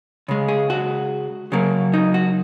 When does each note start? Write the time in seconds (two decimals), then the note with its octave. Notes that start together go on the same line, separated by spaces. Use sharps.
0.28 C#3 G#3
0.48 G#4
0.70 F#4
1.52 C#3 F#3 A#3
1.94 D#4
2.14 F#4